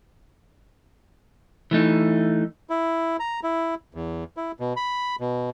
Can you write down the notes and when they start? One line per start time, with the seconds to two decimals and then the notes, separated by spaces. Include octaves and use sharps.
1.71 E3 A3 D#4
2.70 E4
3.20 A#5
3.43 E4
3.95 E2
4.37 E4
4.60 B2
4.76 B5
5.20 B2